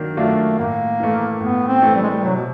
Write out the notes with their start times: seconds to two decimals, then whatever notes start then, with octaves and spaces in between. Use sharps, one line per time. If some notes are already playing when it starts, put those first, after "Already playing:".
Already playing: D#3 F#3 A#3 D4
0.17 F#3 A3 A#3 D4 F4
0.59 A2 A#3
1.00 E3 A3
1.40 A2 B3
1.68 C4
1.82 E3 A3
1.96 G3
2.02 G#3
2.10 G3
2.22 C3 F#3
2.36 B2